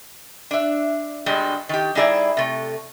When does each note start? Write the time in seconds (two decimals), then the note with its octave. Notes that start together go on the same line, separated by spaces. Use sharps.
0.51 D4 E5
1.26 G2 B2 G3 G#3
1.69 D#3 G4
1.95 G3 D#4 E4 G#4 D5 E5
2.37 C3 A3